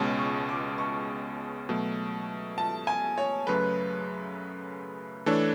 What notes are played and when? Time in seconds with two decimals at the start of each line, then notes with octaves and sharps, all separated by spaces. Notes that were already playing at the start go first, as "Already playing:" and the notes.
Already playing: C#2 B2 G#3 C#4 A5
0.19 C#6
0.49 D6
0.78 C#6
1.69 B2 F#3 A3
2.58 A5
2.87 G#5
3.18 C#5
3.47 F#2 C#3 F#3 A3 B4
5.26 E3 A3 D4 A4 C#5